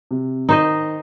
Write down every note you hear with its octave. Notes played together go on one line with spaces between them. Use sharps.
C3
D#3 D#4 C5 D#5